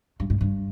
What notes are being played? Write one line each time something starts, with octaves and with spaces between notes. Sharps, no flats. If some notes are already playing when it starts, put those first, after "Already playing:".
G2
G#2
G2